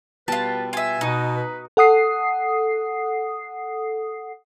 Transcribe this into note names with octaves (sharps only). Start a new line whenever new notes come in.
B2 G3 F4 B4 G5 A5
F4 E5 G#5
B2 D#4 F#4 C#6
B4
A4 F#5 D#6 C7